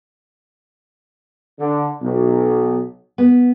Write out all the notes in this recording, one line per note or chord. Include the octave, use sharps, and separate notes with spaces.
D3
B1
B3